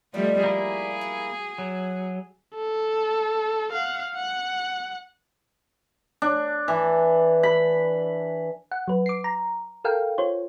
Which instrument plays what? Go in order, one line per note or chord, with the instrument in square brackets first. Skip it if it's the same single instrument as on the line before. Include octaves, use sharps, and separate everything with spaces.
[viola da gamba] F3 G3 A3 [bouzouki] D#4 D5 F#5
[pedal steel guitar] A#3 E4 [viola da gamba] G#4
[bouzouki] F#4
[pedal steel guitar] F#3
[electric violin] A4
F5 F#5
F#5
[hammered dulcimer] D4
E3
B5
[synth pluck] F#5
F#3 B4
D6 C7
A#5
A4 A#4 F5 G5
F4 C5 C#5